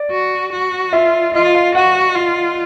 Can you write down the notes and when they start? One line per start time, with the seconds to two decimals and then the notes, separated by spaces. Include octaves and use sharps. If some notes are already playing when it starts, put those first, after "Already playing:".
Already playing: D5
0.11 F#4
0.52 F#4
0.93 F4 E5
1.33 F4 D#5
1.55 F5
1.75 F#4 F#5
2.16 F4